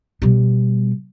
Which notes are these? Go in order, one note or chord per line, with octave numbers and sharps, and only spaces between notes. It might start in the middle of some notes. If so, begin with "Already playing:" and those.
B2 G3